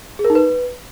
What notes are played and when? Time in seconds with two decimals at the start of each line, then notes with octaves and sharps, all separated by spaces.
0.19 G#4
0.24 A#4
0.30 D#4
0.35 B4